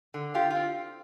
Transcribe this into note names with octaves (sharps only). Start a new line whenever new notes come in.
D3
F4 G4
C4 F4